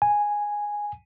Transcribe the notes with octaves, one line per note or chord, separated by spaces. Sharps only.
G#5